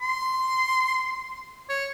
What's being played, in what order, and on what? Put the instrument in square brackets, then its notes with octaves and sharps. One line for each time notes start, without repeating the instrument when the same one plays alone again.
[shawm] C6
C#5